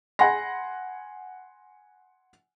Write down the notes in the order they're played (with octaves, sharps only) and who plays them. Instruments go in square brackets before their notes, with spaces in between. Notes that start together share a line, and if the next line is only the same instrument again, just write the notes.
[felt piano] F#5 G#5 B5 C6 A#6